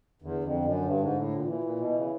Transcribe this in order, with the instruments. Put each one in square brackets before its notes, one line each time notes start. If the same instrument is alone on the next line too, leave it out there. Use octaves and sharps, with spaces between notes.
[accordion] E2 [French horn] D3
[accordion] F2
F#2
G2
G#2
A2
A#2
[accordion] A#2 [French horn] E3
[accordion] A#2
B2
C#3